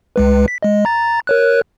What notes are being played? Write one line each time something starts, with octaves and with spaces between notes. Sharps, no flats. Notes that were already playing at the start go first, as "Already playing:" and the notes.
C#2 G#3 B4
B6
G#3 D#5
A#5 A6
A#4 C#5 F#6